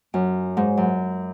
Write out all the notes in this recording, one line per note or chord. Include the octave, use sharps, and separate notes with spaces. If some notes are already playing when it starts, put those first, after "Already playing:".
F#2
G#2
F#2